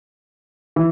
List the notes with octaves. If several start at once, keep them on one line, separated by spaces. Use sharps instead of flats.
E3